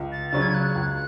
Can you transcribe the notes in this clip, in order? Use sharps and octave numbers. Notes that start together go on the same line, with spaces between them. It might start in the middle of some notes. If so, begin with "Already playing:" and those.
Already playing: C#2
A6
C#3 F#3 C#4 A6
G#6
F#6
C#2